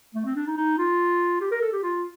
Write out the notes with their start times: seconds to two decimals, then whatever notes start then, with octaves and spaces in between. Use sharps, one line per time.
0.15 A3
0.26 C4
0.36 D4
0.47 D#4
0.57 D#4
0.78 F4
1.41 G4
1.51 A#4
1.62 A4
1.73 G4
1.83 F4